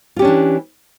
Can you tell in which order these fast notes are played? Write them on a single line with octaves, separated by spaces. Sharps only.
F4 G4 C#4 D4 E3